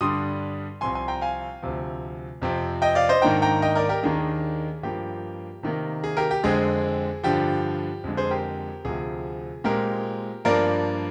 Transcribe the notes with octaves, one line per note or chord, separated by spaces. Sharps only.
G2 D3 G3 D4 C6 D#6
C2 C3 F3 G#5 C6
G#5 C6
G5 A#5
F5 G#5
D2 C3 F3
F2 C3 F3 C4
D#5 G5
D5 F5
C5 D#5
G#2 D#3 A#3 D4 G5 A#5
G5 A#5
D#5 G5
A#4 D5
G4 A#4
D#2 D#3 A#3 D4 G#4
G2 F3 A#3 G4
C3 D#3 A#3
G#4
G4 A#4
G4
F2 D3 G#3 C4 G#4
G2 D3 F3 G4
F2 D3 G#3
G#4 C5
G4 A#4
D2 C3 F3 G#4
A#2 G#3 C4 G4 A#4
G2 F3 A#3 D4 A#4 D5